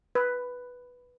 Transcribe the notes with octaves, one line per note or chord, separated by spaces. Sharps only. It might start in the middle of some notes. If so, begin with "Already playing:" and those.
B4